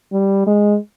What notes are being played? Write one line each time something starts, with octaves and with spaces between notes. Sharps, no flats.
G3
G#3